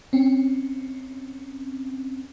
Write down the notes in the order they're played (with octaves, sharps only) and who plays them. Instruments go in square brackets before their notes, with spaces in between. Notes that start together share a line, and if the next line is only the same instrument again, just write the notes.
[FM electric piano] C4 C#4